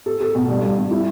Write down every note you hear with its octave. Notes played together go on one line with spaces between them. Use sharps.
A4
A4
B2
G2
G2
G2
E4